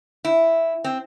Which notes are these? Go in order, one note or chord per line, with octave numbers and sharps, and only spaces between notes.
E4
C4